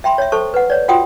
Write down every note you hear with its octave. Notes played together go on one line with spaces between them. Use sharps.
E5 G5 B5 C6
C#5 E5
A4 C5 A5 C#6
B4 F#5
C#5 D5
F4 F#4 F#5 G5 C6 D#6